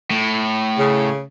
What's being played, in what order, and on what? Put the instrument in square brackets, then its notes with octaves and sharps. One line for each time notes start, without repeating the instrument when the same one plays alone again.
[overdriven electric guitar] A2
[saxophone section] C#3